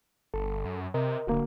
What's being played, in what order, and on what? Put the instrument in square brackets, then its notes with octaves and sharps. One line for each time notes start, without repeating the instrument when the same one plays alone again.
[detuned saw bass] G1 [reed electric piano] A4
[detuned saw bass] F#2
[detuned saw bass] C3 [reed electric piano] A#4 D#5
[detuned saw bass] D1 [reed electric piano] D3 A#3 F#4